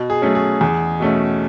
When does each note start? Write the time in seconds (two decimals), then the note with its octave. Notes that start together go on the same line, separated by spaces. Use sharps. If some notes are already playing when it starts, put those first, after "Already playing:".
Already playing: B2
0.10 G#4
0.22 F#3 A3 C#4
0.35 G#4
0.61 E2 G#4
1.00 B2 A3 C#4